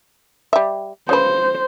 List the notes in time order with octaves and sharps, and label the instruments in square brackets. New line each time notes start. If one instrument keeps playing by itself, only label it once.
[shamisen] G3 E5
[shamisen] C#3 B4 [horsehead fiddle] C5